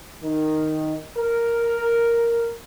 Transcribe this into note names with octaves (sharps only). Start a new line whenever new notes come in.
D#3
A#4